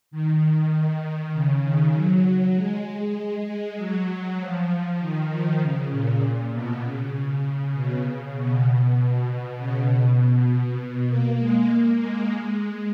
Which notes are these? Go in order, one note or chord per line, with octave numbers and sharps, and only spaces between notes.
D#3
D#3
C#3
D#3
F#3
F#3
G#3
G#3
F#3
F3
D#3
F3
C#3
A#2
B2
C#3
C#3
B2
C#3
B2
B2
C#3
B2
A#3
G#3
A#3
G#3
G#3
G#3